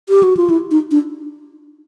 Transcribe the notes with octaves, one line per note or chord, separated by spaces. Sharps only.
G4
F#4
F4
E4
D#4
D4